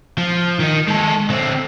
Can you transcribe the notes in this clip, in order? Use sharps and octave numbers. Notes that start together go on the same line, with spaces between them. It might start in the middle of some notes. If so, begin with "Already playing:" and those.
F3
D#3 D#4
G#3 A4
D3 C4